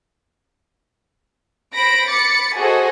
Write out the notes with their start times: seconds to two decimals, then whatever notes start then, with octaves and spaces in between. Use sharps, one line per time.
1.73 C5 B5 A#6 D7
2.09 B5 D6 A6 C#7
2.56 F#4 G#4 A4 C5 D#5 G#5